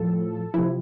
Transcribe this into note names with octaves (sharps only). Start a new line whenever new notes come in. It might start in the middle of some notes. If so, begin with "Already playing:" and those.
Already playing: A2 F3 A4
C3 F3 E4